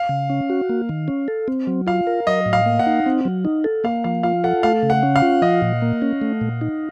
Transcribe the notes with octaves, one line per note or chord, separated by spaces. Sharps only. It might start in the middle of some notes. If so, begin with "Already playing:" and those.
Already playing: F5
C#3
C#4
F#4
A#3
D#3
C#4
A4
C4
F#3
F4 F5
A#4
F#3 D#5
A2
F5
A#3
F#5
D#4
C4
F#3
D#4
A4
A#3 F5
F3 F5
F4 F5
A4 F#5
A3 F5
C#3
F#5
C#4
F5
F4
F3 D#5
A#2
A#3
C#4
A3
A#2
D#4